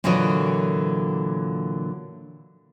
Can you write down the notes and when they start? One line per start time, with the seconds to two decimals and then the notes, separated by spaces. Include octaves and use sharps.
0.04 A#2 D3 E3 F#3 A#4 D#5